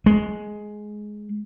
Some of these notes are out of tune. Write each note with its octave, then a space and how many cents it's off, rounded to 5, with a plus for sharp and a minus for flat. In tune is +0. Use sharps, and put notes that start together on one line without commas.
G#3 +10